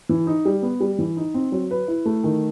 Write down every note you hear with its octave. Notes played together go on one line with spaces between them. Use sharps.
E3
D#4
G3
B3
G3
E3
D#4
C4
F#3
B4
E4
A3
D#3